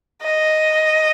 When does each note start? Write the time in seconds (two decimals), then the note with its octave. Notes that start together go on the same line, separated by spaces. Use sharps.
0.23 D#5